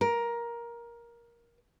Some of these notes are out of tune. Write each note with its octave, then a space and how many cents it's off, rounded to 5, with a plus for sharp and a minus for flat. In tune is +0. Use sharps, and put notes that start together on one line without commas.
A#4 +15